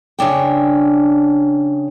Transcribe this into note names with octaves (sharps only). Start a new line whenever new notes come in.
C#3 F#3 D4 G5